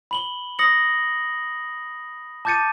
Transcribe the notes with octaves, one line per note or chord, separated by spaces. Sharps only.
B5 F#7 G7
D#6 A#6 C#7 F#7
A5 D6 G6 A6 C#7 D#7